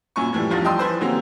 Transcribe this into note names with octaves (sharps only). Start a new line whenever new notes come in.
F#2 A#2 C#4 G#5 C#6
A2 E3 F3 G3
E2 G2 F3 D4 F4
D#5 G5 A5 C6 D#6 E6
E3 F3 B4 C5
D3 E3 F#3 G3 A#3 C4